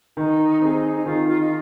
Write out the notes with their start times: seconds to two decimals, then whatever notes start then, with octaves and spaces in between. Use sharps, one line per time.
0.17 D#3 D#4
0.61 C4 D#4 G#4
0.95 D#4
1.06 D#3 F4
1.28 F4
1.41 D#4